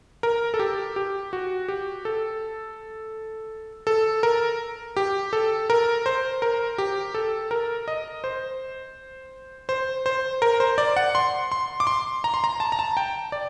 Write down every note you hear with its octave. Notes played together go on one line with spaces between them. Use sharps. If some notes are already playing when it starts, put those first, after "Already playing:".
A#4
A4
G4
G4
F#4
G4
A4
A4
A#4
G4
A4
A#4
C5
A#4
G4
A4
A#4
D#5
C5
C5
C5
A#4
C5
D5
F#5
C6
C6
D6
C6
A#5
C6
A#5
A5
A#5
A5
G5
D5